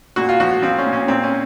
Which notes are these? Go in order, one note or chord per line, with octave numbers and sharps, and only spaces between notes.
A#2 F#4
F4
F3 F#4
F3 C4
C#4
A#2
C#4
A#2 C4
C#4